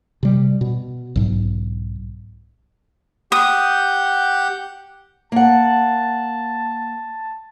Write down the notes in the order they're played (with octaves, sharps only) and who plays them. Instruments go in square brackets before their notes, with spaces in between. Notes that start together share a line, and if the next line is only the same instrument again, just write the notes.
[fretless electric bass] C3 G3
B2
B1 G#2
[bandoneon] G4 F#5 G6 [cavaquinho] D#6
[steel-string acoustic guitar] A#3 F#5 [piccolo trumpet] A5